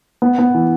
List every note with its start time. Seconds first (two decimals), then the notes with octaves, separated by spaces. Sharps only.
0.22 B3
0.39 B3
0.54 E3